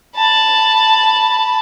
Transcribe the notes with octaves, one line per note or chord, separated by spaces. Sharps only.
A5 B5